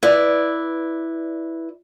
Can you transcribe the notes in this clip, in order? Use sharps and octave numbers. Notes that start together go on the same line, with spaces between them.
E4 B4 D5